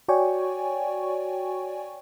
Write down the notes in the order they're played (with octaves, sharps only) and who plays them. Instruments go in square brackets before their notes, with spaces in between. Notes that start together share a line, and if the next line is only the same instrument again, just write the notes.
[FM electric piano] F#4 C#5 D5 G5 G#5 C#6